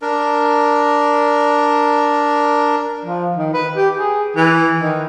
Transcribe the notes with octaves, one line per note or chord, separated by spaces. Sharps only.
D4 A#4
F3
D#3
B4
G4
G#4
E3
D#3